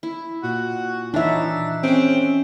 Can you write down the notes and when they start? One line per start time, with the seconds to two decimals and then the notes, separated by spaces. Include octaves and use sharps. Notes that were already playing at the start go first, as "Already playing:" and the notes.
0.03 E4
0.43 A#2 F#4
1.14 E3 D4 D#4 C#5 E5
1.83 C4 C#4 G#4 G5